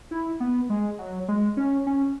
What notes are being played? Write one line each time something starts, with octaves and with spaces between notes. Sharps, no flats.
E4
B3
G#3
F#3
G#3
C#4
C#4